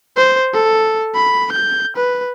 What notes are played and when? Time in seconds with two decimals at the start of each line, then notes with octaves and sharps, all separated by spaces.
0.17 C5
0.54 A4
1.15 B5
1.52 G6
1.96 B4